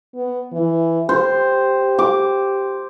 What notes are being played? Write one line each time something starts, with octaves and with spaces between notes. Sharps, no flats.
B3
E3
G4 C5
D6